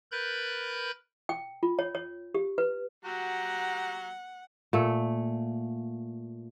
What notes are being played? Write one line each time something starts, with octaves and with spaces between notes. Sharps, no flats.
A#4 B4 B5 F#6 G6 A6
G5
F4
C#5
C#5
G4
B4
F#3 F#4 G4 F#5 A#5
A#2 A3